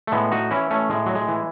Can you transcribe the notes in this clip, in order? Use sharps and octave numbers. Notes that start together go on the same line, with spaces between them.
A3
A2 G#3 B3
D#4 F#4
E3 C#4 E4
A3 C#4
A2 G#3
F#3
G#3
E3